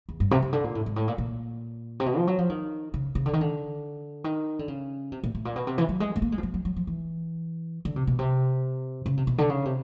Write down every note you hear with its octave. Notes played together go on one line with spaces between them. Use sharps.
E2
G2
C3
C3
D3
A#2
A2
G#2
A2
A#2
A#2
C3
B2
F3
F#3
F3
D#3
C#3
C#3
D3
D#3
D3
D#3
D3
C#3
C3
A#2
A2
A#2
B2
C3
E3
F#3
G#3
A3
A#3
G#3
F3
F#3
F#3
F#3
F3
E3
D3
C3
B2
C3
C#3
C3
B2
D3
C#3
C3